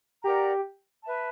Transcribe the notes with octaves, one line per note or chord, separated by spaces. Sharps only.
G4 A#4 D5 F#5 A#5
B4 E5 A5